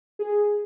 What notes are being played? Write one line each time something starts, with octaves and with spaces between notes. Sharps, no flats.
G#4